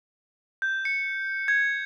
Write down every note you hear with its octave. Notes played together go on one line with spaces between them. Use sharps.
G6
C#7
G#6